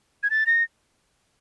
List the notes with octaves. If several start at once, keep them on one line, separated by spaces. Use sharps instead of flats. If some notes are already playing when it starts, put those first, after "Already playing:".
G#6
A6
A#6